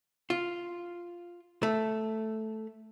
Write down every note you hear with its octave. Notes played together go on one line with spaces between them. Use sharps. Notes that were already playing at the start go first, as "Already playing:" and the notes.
F4
A3